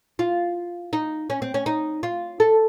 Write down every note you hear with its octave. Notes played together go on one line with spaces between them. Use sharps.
F4
D#4
C#4
C4
C#4
D#4
F4
A4